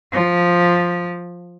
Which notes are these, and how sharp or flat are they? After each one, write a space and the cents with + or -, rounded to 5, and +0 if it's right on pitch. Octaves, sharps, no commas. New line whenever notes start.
F3 +5